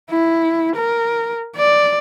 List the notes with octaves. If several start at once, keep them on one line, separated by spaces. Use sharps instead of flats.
E4
A#4
D5